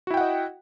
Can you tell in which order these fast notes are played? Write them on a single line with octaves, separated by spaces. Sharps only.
F#4 E4 G5 F#5 D#5